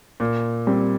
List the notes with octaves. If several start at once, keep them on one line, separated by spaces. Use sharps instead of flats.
A#2
G3 C4